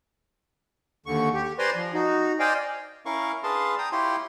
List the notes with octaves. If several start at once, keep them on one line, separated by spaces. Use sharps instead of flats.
D#2 D3 C#6
G4
B4 C5 D5 G#5 A#5 C6
F3
D#4 F#4
C5 D5 D#5 F5 G5 G#5
C#4 E4 A#4 F5 C#6
D4 G#4 B4 F5 A5 C6
G5 A#5 D#6
E4 F4 G4 C#5 G5 C6